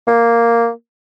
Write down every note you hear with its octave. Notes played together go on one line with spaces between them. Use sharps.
A#3